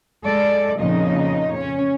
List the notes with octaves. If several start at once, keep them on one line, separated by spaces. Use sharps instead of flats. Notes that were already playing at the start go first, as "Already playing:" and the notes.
G#3 A4 D5
F2 A#2 C#3 F3 D#4 D#5
C#4 C#5